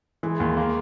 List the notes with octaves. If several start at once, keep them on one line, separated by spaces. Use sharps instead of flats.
E3 G#3
D#2
A#3